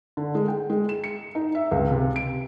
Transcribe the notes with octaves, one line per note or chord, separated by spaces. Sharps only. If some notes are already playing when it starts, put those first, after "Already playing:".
D3
G#3
G5
G#3
E7
C#7
D#4
E5
C#2
C3
D7